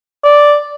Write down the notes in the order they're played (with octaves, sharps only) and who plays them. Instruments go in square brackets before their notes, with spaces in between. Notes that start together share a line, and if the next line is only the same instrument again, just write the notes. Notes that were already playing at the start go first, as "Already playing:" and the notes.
[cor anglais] D5